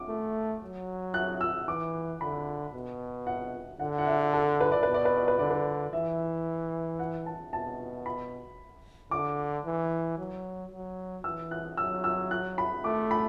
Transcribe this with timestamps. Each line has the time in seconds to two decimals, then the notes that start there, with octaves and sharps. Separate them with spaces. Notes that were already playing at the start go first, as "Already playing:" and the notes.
Already playing: D6
0.08 A3
0.62 F#3
1.14 F#6
1.41 E6
1.67 E3 D6
2.21 D3 B5
2.74 B2
3.27 F#5
3.80 D3 F#5
3.98 F#5
4.06 E5
4.34 A4
4.61 B4
4.72 D5
4.83 B2 B4
4.94 D5
5.05 B4
5.17 D5
5.28 B4
5.39 D3 D5
5.51 B4
5.93 E3 E5
6.99 F#5
7.26 A5
7.52 B2 A5
8.06 B5
9.11 D3 D6
9.66 E3
10.18 F#3
10.72 F#3
11.24 E3 E6
11.51 F#6
11.77 F#3 E6
12.04 E6
12.31 F#6
12.58 B5
12.84 A3 D6
13.11 B5